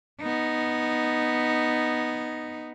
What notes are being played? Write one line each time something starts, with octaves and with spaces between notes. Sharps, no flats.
B3 D#4